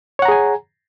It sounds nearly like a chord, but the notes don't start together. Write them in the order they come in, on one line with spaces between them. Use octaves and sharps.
C#5 F#5 A#5 G#4 G#5